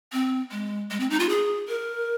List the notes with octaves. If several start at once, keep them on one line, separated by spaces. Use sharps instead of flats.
C4
G#3
G#3
C4
D#4
F4
G#4
A#4